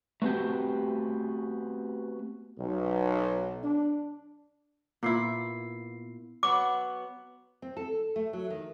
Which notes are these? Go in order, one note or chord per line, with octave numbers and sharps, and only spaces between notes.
A3 B3 C4 F#4 G4
B1
D4
A#2 B3 E4 C7
F#3 B3 D6
C4
A4
A3
F#3
D#3